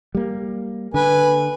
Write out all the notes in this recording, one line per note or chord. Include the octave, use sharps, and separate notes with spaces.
G3 A#3
D3 B4 G#5